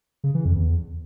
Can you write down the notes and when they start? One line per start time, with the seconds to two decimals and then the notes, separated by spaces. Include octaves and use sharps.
0.24 C#3
0.34 E3
0.45 F2
0.56 E2